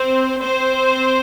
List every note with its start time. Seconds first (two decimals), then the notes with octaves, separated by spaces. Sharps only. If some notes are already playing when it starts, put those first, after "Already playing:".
Already playing: C4 C5
0.41 C4 C5